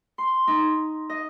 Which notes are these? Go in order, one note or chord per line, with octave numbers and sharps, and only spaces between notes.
C6
D#4
D#5